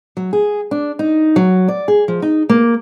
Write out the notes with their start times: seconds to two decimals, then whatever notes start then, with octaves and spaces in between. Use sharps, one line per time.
0.17 F#3
0.33 G#4
0.71 D4
0.99 D#4
1.36 F#3
1.68 D5
1.88 G#4
2.08 F3
2.22 D#4
2.49 A#3